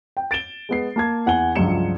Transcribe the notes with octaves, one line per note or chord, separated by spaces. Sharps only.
G5
A6 D7 E7 G7
G#3 B3 C7
A#3 A5 G#6
E2 F#5 G#5 G7
C#2 G2 F3 F#3 C#7 E7